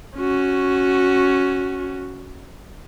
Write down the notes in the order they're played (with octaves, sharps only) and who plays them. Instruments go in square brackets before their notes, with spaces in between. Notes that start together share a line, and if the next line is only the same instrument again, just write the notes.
[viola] C#4 F#4